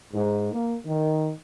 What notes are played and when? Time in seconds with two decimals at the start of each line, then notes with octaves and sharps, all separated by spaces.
0.14 G#2
0.53 A#3
0.87 D#3